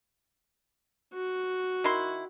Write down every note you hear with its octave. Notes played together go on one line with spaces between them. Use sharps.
F#4
D#3 E4 C6